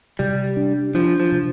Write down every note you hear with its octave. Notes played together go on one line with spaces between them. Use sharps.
C3 G3
D4
F3 D4
F3
C3